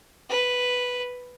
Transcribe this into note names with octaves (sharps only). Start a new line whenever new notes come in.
B4